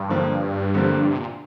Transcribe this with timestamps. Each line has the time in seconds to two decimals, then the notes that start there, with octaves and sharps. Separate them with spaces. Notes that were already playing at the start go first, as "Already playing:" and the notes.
Already playing: G2
0.09 D3 F3 A#3
0.75 D3 F3 A#3
1.10 C3
1.18 A#2